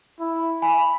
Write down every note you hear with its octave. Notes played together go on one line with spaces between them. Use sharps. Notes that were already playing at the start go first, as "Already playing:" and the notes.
E4
G#5 B5